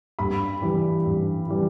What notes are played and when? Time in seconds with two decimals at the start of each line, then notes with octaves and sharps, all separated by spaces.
0.19 G2 B5
0.62 E3 G3
1.06 G2
1.48 E3 G3